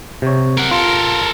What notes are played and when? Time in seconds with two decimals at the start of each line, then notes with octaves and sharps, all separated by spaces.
0.22 C3 C#5
0.58 A#4 F#5
0.71 F4 A4 A#4